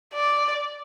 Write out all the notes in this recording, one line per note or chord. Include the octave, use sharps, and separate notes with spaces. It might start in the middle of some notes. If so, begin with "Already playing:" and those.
D5